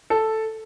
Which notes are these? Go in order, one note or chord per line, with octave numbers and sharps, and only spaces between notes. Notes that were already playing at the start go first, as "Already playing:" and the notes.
A4